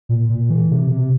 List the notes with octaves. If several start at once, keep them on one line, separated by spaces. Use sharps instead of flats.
A#2
A#2
E3
C3
C3